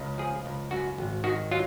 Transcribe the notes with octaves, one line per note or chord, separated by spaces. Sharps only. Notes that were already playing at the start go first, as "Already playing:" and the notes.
Already playing: C#2 C#3
F3 G#4
C#2
F#2 F#4
G#1
D#3 F#4
F#3 F4